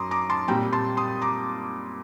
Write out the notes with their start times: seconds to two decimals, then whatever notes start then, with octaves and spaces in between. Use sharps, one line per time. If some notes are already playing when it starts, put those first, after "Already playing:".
Already playing: F#2 F#3 A#5 C6 D6 D#6
0.11 A#5 D6
0.30 A5 C6
0.48 A#2 G3 C4 G5 A#5
0.73 A5 C6
0.97 C6 D#6
1.22 A#5 D6